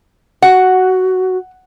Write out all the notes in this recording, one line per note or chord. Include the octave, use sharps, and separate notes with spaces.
F#4 F#5